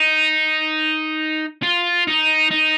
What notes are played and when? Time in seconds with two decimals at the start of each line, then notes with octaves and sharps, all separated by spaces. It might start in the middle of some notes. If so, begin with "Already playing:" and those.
Already playing: D#4
1.63 F4
2.07 D#4
2.51 D#4